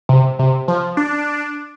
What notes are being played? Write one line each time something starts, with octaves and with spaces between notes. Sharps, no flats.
C3
C3
F3
D4